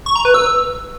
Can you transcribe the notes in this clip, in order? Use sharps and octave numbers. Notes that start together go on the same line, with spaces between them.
C#6
A#5
B4
E6